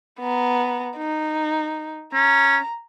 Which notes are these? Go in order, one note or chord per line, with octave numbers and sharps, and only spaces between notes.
B3 A#5
D#4
C#4 A#5